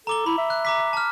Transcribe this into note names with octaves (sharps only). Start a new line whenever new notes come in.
A4 A#5 D6 G7
E4 B5
E5
F#6
A#5 D6 B6
A5 F6